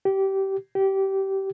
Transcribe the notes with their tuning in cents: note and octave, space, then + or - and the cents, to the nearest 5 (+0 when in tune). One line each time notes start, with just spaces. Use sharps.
G4 -20
G4 -20